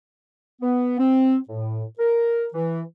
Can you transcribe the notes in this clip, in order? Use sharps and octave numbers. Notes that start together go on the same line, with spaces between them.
B3
C4
A2
A#4
E3